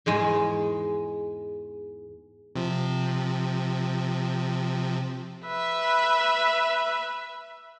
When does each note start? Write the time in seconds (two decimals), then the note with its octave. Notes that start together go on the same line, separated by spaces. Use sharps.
0.06 E2 G#2 G#3
2.56 C3 F3
5.46 B4 E5